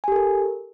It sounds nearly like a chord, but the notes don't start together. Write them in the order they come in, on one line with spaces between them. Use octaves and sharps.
G#5 G4 A4 A#4